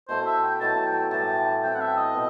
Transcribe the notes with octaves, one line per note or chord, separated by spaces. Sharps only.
B2 A3 E4 B4 C5
E5
G5
B2 F#3 A3 E4 A5
G5
A2 E3 G3 A5
A3 C4 E4 G5
F#5
E5
D#5
B2